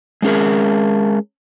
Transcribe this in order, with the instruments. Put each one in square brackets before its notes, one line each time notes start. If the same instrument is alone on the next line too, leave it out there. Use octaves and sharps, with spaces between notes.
[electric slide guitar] G#3 A3 C#4 D#4 G#4 A#4